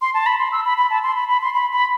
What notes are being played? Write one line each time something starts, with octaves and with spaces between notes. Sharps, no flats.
C6
A5
B5
C6
E6
B5
B5
A5
C6
B5
B5
C6
B5
B5